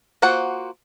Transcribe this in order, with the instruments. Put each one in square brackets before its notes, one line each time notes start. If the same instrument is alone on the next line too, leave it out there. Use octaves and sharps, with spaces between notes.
[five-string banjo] A#3 F4 F#4 C5 F#5